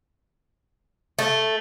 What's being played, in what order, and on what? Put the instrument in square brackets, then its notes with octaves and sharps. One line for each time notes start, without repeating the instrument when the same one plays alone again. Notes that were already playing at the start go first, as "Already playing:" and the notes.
[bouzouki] A3